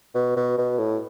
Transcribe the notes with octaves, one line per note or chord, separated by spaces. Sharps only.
B2
B2
B2
A2